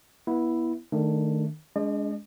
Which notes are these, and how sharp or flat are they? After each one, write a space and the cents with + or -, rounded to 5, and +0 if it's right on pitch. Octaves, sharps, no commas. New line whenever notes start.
B3 -25 E4 +0
D#3 -15 A3 +0 D4 +0
G#3 +0 D4 -40 D#5 -45